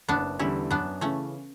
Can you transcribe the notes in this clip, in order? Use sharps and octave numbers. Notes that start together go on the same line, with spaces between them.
F#1 B3 D4
E2 D3 G3 C#4 E4
F#2 B3 D4
C#3 E3 A3 C#4